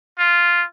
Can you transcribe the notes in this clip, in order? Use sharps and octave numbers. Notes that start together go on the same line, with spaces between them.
F4